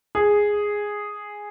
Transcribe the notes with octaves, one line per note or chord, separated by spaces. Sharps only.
G#4